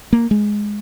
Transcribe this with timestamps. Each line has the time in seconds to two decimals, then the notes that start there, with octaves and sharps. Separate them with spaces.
0.13 A#3
0.31 G#3